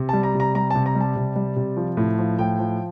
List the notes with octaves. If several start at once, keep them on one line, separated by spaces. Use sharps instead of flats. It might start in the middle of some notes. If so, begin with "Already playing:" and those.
Already playing: C3
G3 A5
A#5
C3
A#5
G3 A#5
C3 A5
A#5
G3
A5
C3
G3
C3
F3
A2
F3
A2 G5
F3